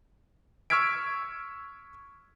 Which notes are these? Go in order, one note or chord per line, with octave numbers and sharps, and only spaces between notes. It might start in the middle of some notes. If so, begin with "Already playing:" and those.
C#6 E6 F6 G#6 B6 D7